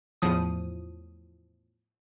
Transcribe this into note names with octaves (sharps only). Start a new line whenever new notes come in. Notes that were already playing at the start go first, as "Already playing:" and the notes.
E2 A2 F3 D#6